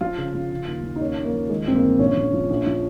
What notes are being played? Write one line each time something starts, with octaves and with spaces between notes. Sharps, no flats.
F3 F4
C#3
F3
C#3
D#2
F3
D#4
D#2 C#4
D#2
A#3
F3
D#3 G#3
G1 C4
A#3
D#3
A#1 C#4
A#1
F3
A#1
F3